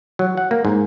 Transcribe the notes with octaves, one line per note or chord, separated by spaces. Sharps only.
F#3
F#5
A#3
G#2